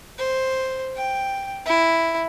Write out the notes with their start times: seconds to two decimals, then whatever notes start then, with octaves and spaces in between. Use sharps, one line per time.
0.19 C5
0.97 G5
1.66 E4